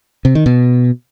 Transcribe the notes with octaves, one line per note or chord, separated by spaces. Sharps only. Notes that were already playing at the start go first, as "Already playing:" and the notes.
C3
D#3
B2